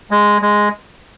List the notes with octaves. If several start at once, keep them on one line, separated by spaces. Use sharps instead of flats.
G#3
G#3